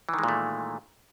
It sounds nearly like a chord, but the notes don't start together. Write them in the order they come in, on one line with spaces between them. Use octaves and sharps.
E3 D#3 G#3 A#2 A3